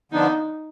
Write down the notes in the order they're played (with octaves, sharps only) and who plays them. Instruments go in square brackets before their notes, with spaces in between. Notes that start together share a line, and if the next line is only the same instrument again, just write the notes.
[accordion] D3 F3 B3 D4 [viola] D#4